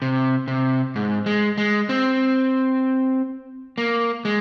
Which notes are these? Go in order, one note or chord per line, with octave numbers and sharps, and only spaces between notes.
C3
C3
G#2
G#3
G#3
C4
A#3
G#3